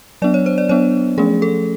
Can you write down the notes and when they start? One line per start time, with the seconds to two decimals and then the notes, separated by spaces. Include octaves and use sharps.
0.22 F#3 B3 D4 D5
0.34 C#5
0.46 C5
0.58 D5
0.69 F#3 B3 D4 C#5
1.18 F3 A3 C#4 G#4
1.42 A4